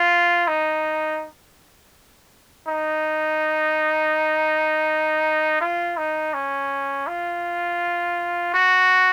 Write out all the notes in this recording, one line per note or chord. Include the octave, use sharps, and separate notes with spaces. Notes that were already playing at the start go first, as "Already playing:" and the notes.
Already playing: F4
D#4
D#4
F4
D#4
C#4
F4
F#4